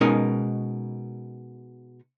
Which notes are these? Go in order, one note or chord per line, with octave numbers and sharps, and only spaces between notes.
B2 G#3 C#4 D#4 A#4 G#5